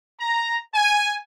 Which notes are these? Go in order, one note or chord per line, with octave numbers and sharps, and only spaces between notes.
A#5
G#5